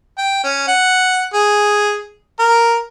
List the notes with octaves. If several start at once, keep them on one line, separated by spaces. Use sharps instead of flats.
G5
C#4
F#5
G#4
A#4